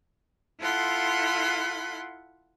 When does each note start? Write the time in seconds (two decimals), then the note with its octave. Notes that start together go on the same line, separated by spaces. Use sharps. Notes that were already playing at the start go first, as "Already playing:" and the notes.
0.60 E4 F4 A4 F#5 B5 C6